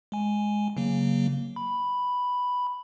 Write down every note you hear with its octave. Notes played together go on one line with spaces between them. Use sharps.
G#3 G#5
C#3 F#3 A#3
B5